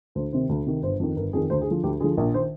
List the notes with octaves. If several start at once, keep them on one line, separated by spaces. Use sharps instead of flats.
D2 C5
C3 D#3 C5
D2
C3 D#3
G1 C5
F2 D#3
G1 A#4
F2 D#3 G#4
D2 C5
G#4
D3 F3
D2 G4
D3 F3 G#4
A#1 A#4
D#3 C5